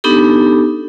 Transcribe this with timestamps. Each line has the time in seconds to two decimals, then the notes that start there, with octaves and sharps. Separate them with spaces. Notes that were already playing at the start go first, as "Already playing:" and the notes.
0.04 B3 D4 D#4 G4 A4